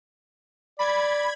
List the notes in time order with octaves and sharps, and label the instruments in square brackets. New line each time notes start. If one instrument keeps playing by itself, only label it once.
[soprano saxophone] D5 [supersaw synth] B5 G#6